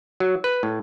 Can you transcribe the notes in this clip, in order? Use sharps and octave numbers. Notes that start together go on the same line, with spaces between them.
F#3
B4
A2